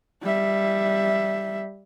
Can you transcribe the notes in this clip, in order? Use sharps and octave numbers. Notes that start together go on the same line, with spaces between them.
G3 E5